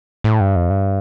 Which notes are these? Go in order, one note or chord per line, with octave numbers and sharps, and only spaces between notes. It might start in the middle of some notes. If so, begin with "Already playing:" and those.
A2
G2
F2
G2